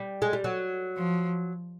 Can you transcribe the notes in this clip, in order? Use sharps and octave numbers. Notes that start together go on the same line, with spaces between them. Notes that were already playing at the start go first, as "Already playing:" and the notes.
Already playing: G3
G#3
G3
F#3
F3